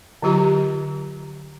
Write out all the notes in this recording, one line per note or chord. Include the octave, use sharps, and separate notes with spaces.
D3 F#3 F4 G4 A#5